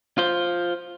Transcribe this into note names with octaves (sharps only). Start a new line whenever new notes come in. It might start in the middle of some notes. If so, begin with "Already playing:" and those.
F4 C5